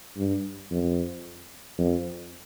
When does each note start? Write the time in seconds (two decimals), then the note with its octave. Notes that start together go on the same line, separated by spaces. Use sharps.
0.17 G2
0.71 F2
1.78 F2